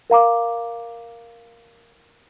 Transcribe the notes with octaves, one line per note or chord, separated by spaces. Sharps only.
A#4 F5 A#5 D6